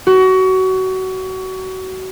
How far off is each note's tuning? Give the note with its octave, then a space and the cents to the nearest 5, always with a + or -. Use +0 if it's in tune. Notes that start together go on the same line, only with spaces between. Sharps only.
F#4 +25